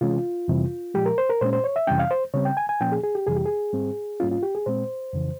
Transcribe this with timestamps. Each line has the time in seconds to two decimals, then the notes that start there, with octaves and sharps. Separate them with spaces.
0.01 C3 E3 G#3 C#4 F4
0.48 F2 C3 E3 G3
0.94 A#2 F3 G#3 G4
1.06 A#4
1.18 C5
1.30 A#4
1.41 A#2 G#3 C#4 C5
1.53 C5
1.64 C#5
1.76 E5
1.87 F2 C3 E3 G3 C#4 G5
1.99 F5
2.11 C5
2.34 C#3 G3 C4 C#5
2.45 G5
2.57 G#5
2.69 G#5
2.81 A#2 F3 A#3 C#4 G5
2.92 G#4
3.03 G#4
3.15 G4
3.26 F2 C3 E3 G3 G#4
3.37 G4
3.46 G#4
3.73 G#2 G3 C4
4.20 G#2 G3 A#3 C#4 F4
4.31 F4
4.43 G4
4.55 G#4
4.66 A#2 G#3 C4 C5
5.13 F2 C#3 E3